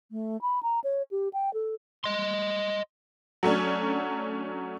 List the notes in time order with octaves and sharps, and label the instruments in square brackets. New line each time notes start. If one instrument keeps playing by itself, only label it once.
[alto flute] A3
B5
A#5
C#5
G4
G5
A4
[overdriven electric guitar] D#5 C6
[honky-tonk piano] F#3 A3 C#4 D4